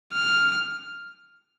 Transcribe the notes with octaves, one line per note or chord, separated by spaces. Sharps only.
F6